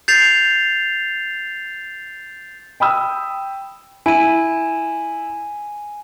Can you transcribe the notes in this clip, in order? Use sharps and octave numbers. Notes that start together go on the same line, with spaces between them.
G6 A6 C7 F7
G5 B5 D#6 E6
E4 G#5 D#7